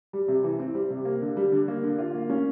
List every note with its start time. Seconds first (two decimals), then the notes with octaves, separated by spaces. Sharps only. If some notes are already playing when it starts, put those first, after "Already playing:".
0.13 G3
0.28 C3
0.44 E3
0.59 C4
0.75 G3
0.90 C3
1.05 A#3
1.21 D3
1.37 G3
1.52 D3
1.68 A#3
1.83 D3
1.99 F4
2.14 A#3
2.30 C#4